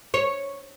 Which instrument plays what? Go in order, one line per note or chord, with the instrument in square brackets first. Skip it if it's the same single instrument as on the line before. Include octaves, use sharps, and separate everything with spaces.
[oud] C#5